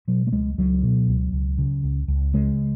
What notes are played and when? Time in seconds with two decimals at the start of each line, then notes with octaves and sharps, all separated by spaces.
0.08 B2 F#3
0.27 A3
0.32 C#2 G#3
0.58 C#2 F#3
0.83 B2
1.08 C#2
1.33 C#2
1.58 C#3
1.84 C#2
2.08 C#2
2.34 C#3 G#3